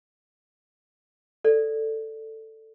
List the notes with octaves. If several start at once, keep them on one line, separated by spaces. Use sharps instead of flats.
A4 D5